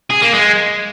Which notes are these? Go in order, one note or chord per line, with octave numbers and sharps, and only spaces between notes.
G#4
A#3
G#3